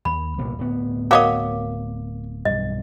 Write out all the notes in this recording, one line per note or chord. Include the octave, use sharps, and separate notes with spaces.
D#2 B5
C2 G2 A#2
D1 B3
F#4 A#4 C#5 D#5 F5 D6
B1 G2 D#5